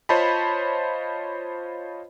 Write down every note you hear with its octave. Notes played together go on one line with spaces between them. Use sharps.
F4 C5 C#5 D#5 A5 B5